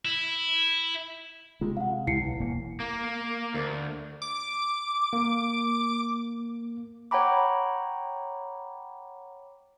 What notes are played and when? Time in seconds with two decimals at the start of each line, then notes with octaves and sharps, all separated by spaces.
0.05 E4
1.61 C3 G#3 F4
1.77 F5 F#5
2.07 C#2 C3 E4 C7 C#7
2.22 B1
2.40 E1 A#3
2.80 A#3
3.54 D2
4.22 D6
5.13 A#3
7.11 C#5 F#5 G5 A#5 B5 D6